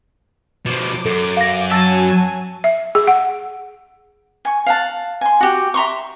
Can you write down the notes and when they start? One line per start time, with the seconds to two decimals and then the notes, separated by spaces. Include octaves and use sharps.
0.66 B2 F3 D6
1.05 F#2 A4
1.37 F5 A#6
1.71 F#3 G#5 A5 E6 A6 D#7
2.64 E5
2.95 G#4
3.07 F#5
4.45 G#5 C#6
4.66 F5 F#5 A5
5.21 G#5 C6
5.41 F#4 G4
5.74 E5 A#5 C6 C#6